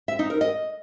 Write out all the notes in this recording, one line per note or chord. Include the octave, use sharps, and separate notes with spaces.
E5
D#4
A#4
D#5